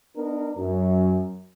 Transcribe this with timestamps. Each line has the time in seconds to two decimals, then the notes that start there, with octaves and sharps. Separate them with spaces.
0.16 B3 D4 D#4 A#4
0.57 F#2